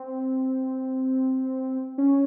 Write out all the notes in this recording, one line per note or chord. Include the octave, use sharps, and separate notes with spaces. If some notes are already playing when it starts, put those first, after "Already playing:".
Already playing: C4
C#4